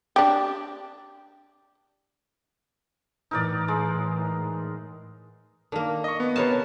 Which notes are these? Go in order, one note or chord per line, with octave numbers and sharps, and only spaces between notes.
D4 G4
A2 E3 D#4 A#4 D5
G#3
D#3 A#3 D4
D#5 C#6
B3
C3 A#4 B4 C#5 A5